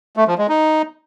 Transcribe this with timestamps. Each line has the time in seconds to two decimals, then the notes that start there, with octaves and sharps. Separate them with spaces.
0.17 A3
0.28 F3
0.38 G#3
0.49 D#4